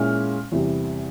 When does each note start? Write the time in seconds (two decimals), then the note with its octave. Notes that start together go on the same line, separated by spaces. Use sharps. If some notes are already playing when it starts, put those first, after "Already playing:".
Already playing: A#2 G#3 C#4 E4 F6
0.52 E2 C3 G3